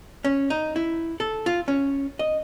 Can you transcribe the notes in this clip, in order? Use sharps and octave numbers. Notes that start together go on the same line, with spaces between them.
C#4
D#4
E4
A4
F4
C#4
D#5